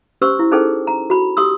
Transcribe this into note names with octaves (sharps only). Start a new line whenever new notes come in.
C#4 G4 C5 C6 C#6 E6
E4
C#4 D#4 G#4 A4 C5 G5
A#5
F#4 B5
G4 C6 D#6 E6